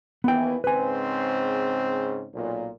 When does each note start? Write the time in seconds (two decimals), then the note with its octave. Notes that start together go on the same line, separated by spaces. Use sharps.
0.24 D#2 E3 B3 G5
0.64 G#2 C#3 C4 B4 G#5
2.33 B1 A#2